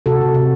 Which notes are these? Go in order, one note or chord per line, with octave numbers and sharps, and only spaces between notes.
C3 F#4 A4
C3
C3